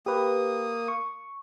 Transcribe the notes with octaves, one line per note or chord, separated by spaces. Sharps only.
A#3 G4 B4 D#6
C#6